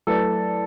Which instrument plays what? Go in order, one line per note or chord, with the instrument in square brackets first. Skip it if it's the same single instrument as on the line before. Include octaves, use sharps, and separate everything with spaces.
[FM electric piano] F#3 A3 E4 B4 D5 [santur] A4